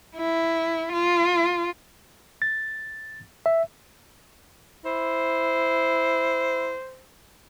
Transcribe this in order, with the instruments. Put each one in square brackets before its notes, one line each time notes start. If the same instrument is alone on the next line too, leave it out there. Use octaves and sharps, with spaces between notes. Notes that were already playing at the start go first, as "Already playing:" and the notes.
[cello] E4
F4
[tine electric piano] A6
E5
[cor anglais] E4 [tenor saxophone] C5